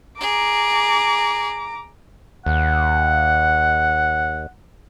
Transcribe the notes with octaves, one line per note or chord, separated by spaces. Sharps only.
G#4 A#5 D6
D#2 F#5